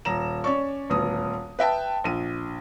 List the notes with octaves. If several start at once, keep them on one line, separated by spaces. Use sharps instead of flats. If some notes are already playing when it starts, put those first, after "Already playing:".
D#1 A#5 E7
C#4 D5 C#6
D#1 D2 B3 D#6
B4 E5 G5 A5
A#1 D#7